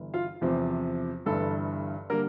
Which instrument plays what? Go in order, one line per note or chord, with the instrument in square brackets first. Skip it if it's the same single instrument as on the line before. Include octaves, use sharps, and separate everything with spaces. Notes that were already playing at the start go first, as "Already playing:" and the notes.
Already playing: [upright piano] G1 E3
F4 F5
E2 C3 F3
G1 G2 E3 A4
D3 G3 A#3 A#4